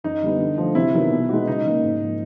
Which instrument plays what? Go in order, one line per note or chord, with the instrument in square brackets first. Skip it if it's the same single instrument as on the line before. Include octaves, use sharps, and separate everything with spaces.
[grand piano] F#2 [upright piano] D#4
[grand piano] D3 G3 B3
D3
F3 A3
[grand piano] C3 [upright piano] E4
[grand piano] D#3 F#3 B3
B2
G#3 B3 D#4 F#4
[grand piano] C#3 [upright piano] D#4
[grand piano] F#3 A#3
G#2
F3 A#3